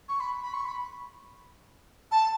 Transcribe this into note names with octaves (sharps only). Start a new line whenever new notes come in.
C#6
B5
B5
C#6
B5
A5